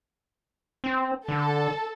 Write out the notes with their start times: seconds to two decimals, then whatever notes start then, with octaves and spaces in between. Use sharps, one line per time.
0.84 C4
1.28 D3 A4